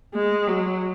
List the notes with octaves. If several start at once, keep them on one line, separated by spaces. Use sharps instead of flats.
G#3
F#3